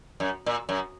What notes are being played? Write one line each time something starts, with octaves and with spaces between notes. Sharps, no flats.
F#2
A#2
F#2